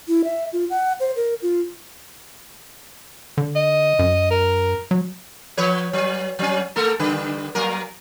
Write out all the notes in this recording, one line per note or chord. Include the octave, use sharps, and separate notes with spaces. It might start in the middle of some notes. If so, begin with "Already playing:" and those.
E4
E5
F4
F#5
C5
A#4
F4
D3
D#5
F#2
A#4
F#3
F3 B4 C#5
F#3
F#3 C#4
A3 A4 A#4
D3 G3 B4
F#3 A#3 A#4